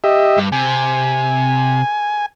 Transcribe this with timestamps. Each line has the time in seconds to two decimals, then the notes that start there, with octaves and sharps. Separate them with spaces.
0.04 G4 D#5 E5
0.38 G2
0.52 C3 G#5